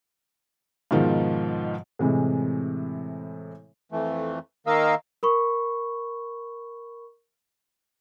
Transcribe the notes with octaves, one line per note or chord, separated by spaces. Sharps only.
G#2 B2 D#3 F3
A2 C3 E3 G#3
F2 E3 A3
D#3 A#3 A#4 D#5 F5 E6
A#4 B5 C#6